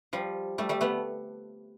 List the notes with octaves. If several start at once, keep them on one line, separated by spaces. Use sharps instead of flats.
F3 G3
G3 A3
G3 A3
A3 B3